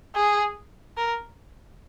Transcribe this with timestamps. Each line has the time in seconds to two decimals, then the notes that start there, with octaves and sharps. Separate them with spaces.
0.15 G#4
0.97 A#4